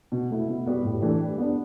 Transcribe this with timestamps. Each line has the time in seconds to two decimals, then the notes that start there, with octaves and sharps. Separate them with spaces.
0.12 B2
0.31 A3 E4
0.49 B2
0.66 G3 B3 F#4
0.84 A2
1.02 E3 A3 D4 G4
1.20 G3
1.38 B3 D4